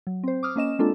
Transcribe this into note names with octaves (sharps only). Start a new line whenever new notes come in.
F#3
C4 C5
D6 D#6 F6
A#3 C#4 D#5 E7
G#3 A#3 C4 D4 F4 A4